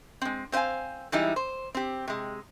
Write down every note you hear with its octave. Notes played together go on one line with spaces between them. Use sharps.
G#3 C4
C4 C5 D#5 F5 G#5
E3 G3 G#3 D#4 E4
C5
C4 G4
C3 G#3